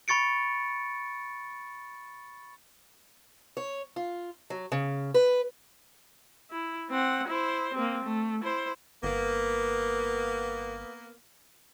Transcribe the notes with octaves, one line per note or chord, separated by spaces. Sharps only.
B5 C#6 A6 C#7 D7
C#5
F4
F#3
C#3
B4
E4
C4 F#5
E4 C5
A#3 C4
A3
E4 C5
G1 A#3 B3